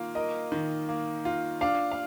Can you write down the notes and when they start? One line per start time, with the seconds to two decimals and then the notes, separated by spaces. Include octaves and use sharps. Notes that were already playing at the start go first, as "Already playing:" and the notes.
Already playing: D#3 A#3 F4
0.15 A#4 D#5
0.52 D#3
0.89 A#3
1.25 F4
1.61 D4 F5
1.92 F5